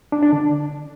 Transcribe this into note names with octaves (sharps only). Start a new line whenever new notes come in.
D4
D4
D3